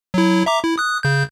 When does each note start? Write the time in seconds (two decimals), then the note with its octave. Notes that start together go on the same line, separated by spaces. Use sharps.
0.14 F#3 E4
0.46 E5 A#5 D6
0.64 E4
0.78 D#6 F#6
1.03 C#3 G6